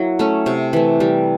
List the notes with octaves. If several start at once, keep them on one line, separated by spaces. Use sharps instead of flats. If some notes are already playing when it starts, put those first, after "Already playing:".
Already playing: F#3 A#3 E4
A3 C#4
C3
E3 A3
G3